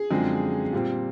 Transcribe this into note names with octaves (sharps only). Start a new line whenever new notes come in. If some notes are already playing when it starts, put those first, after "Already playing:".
Already playing: G#4
F#2 D3 F3 G#3 C4
A#2 G3 C4